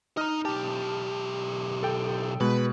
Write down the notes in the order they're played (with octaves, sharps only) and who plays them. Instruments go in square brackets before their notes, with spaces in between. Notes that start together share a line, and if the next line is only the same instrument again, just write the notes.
[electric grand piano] D#4 F6 [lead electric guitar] D#5 A#5
[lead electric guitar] B1 G4 [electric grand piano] A5
[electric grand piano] A4 G5
[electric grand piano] B2 G#3 [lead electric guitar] B4